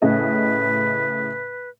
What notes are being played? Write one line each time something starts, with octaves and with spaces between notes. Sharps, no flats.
A2 C#3 B4 D#5